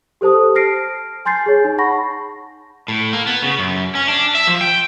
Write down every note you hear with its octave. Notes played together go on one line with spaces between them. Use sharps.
G4 A4 C5 A5 D#6
A5 F6 A#6 C7 D7
G#5 C6 G6 A6 C7
G#4 C#5
D#4
F#5 A5 B5 C#6 A#6
A2
A#3
B3
C#3
F#2
C#4
D4
E5
F3
G5